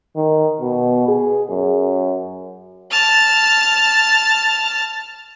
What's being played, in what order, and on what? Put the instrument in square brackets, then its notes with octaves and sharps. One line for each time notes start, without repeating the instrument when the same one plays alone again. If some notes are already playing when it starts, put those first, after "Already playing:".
[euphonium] D#3
B2
G#4
F#2
[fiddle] A5 F6